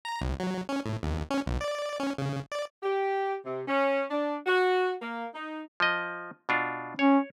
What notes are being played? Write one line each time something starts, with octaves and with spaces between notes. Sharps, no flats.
A#5
C2
F#3
C#4
A2
D#2
C#4
B1
D5
C#4
C#3
D5
G4
C3
C#4
D4
F#4
A#3
D#4
F3 D#5
B2 D4 F4
C#4 C#5